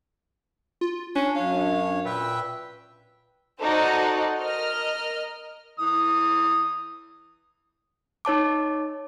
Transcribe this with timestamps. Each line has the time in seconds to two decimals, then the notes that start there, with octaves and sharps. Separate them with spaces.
0.81 F4
1.15 C#4 D4
1.36 F#2 C#5 F5
2.05 A#2 B4 E5 G5
3.61 D#4 F#4 A4 C5 D5
4.41 A#4 D#5 F6
5.79 E3 D#6
8.25 D#4 C#5 A5 D6